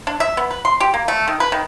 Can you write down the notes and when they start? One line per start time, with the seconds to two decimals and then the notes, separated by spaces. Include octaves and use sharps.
0.07 D4
0.20 E5
0.37 B3
0.51 B4
0.65 C6
0.80 G4
0.94 A#3
1.08 A3
1.28 D#3
1.40 B4
1.52 D#3